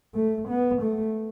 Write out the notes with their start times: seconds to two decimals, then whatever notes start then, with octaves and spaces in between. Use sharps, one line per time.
0.15 A3
0.48 B3
0.82 A3